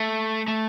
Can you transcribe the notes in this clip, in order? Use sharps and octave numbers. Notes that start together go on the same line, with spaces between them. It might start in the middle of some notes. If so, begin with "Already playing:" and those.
Already playing: A3
A3